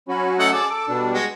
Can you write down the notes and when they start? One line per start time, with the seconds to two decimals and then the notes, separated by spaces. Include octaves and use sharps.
0.09 F#3 C#4 F#4 B5
0.39 A3 D#5 F#5
0.52 G#4 D5 A5 E6
0.69 A4 D6
0.88 B2 G3 D4
1.13 G#3 F#4